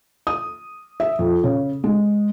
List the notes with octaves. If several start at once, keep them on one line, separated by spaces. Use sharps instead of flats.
D#6
E5
F2
C#3
G#3